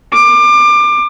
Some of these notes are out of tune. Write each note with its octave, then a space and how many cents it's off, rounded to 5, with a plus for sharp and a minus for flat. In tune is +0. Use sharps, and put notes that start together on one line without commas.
D6 +25